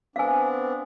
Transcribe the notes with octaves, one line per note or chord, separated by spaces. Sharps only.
B3 C4 D4 F5 G#5